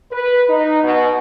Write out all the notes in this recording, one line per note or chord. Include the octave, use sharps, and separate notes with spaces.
B4
D#4
B2